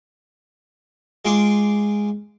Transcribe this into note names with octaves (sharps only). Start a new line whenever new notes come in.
G#3 F4 F5 D6